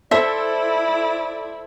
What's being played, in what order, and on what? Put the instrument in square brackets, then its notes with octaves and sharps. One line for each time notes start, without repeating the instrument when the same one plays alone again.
[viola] E4 [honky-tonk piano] A4 C5 [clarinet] D5 [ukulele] E5